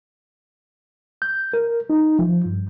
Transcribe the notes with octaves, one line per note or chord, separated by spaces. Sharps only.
G6
A#4
D#4
F3
G2